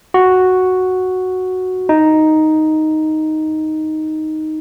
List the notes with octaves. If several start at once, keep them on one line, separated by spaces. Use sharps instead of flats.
F#4
D#4